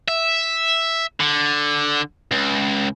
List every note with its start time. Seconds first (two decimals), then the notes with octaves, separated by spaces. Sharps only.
0.08 E5
1.20 D3
2.32 C#2